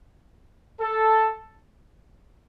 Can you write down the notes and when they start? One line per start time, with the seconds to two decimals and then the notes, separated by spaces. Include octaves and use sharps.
0.80 A4